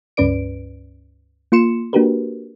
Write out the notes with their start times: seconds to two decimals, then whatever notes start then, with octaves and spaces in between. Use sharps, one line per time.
0.17 C#2 G2 C#4 B4 D5 D7
1.52 A#3 F4 C6 C#7 E7
1.93 A#3 D4 F#4 G4 A#4 B4